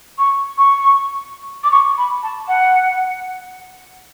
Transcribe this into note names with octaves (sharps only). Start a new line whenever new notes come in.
C#6
C#6
D6
C#6
B5
A5
F#5